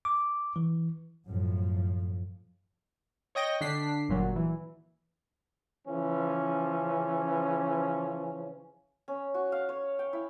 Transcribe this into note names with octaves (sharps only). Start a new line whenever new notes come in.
D6
E3
F#2 A2 F3
C#5 D#5 G5 A#6
D3 D4 B6 C7
G1 A#2 F#3
E3
C#3 E3 F3 C#4
C#4
F#4
F5
C#5
G5
E4